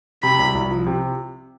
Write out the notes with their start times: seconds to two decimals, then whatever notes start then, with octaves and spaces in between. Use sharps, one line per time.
0.23 C3 B5
0.39 C2
0.55 C2
0.71 F3
0.86 C3